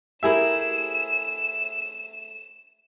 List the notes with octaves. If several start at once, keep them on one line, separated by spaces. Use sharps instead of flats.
A3 E4 G4 G#4 A#4 E5 E7